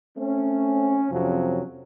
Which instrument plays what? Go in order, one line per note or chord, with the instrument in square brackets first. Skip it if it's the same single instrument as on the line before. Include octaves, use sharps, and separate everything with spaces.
[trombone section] A3 C4 C#4
F2 C3 F3 F#3 C#4